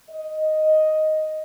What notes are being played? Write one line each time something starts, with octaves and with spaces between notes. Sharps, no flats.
D#5